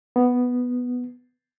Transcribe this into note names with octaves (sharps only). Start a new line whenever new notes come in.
B3